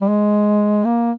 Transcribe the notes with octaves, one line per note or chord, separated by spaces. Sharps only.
G3
G#3
A#3